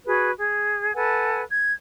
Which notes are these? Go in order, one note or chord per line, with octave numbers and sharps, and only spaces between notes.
F#4 G#4 B4
G#4
A4 B4 F#5 G#5
G#6